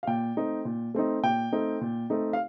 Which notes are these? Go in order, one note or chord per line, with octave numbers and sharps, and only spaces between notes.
F5
A#2 G5
A3 C4 D#4
A#2
A3 C4 D#4
A#2 G5
A3 C4 D#4
A#2
A3 C4 D#4
F5